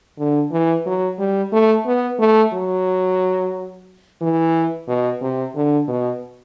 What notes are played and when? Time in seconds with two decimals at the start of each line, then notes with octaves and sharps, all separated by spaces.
0.19 D3
0.52 E3
0.86 F#3
1.19 G3
1.52 A3
1.86 B3
2.20 A3
2.54 F#3
4.21 E3
4.88 B2
5.22 C3
5.55 D3
5.88 B2